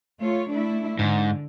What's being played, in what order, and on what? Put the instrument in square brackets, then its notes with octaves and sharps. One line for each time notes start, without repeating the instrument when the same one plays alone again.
[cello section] A3 F4 C#5
A3 D4 E4
[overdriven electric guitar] G#2 [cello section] D3